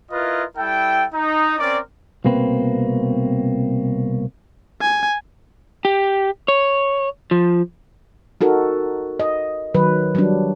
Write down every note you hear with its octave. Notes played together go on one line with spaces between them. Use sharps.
E4 F4 A#4 B4 D#5
G3 E4 A4 G5
D#4
C4 C#4 A#4 D5
C2 B2 A#3 C4 B4
G#5
G4
C#5
F3
D#4 F#4 A4 A#4
D#5
D#3 F#3 B4
F#3 G3 D4